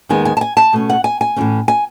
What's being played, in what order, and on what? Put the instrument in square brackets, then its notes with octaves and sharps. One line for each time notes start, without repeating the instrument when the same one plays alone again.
[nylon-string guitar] D#2 D#3 G#3 B3 G#5
G#5
A5
G#5
A5
B2 A3 C#4
F#5
G#5
G#5
A2 E3 A3 C#4
G#5